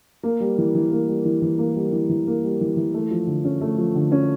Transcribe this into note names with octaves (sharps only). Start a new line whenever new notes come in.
A#3
G3
E3
E3
A#3
G3
E3
E3
A#3
G3
E3
E3
A#3
G3
E3
E3
A3
F3
D3
C#4
A3
F3
D3
C#4